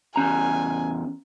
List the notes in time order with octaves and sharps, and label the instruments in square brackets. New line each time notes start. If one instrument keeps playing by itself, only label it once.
[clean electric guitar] E2 C#4 A#5 [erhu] G#5